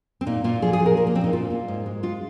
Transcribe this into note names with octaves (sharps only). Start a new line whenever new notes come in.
C4
A#2 D#4
A#2 F4
F3 G#4
G#4
A#2
A#4
F3 A#4
A#3
A#2 C4
D#4
A#2 F4
A#2
G#2
G#3
G#3 F4